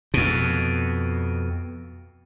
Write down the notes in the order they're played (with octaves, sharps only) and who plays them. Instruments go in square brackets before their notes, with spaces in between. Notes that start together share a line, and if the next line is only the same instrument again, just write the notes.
[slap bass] F2 B2